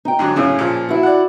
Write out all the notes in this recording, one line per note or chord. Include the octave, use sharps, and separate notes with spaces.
D#4 G5
G#2 D3 F#3
F#2 A2 C#3 C#4 G#4
A#2 F3
E4 F#4
D5 F#5